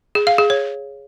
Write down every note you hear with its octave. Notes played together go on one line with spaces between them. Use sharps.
G#4
F5
G#4
C#5